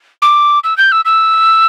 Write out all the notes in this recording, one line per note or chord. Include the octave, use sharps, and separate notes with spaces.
D6
E6
G6
E6
E6